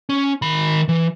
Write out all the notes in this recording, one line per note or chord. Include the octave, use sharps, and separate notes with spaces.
C#4
D#3 B5
E3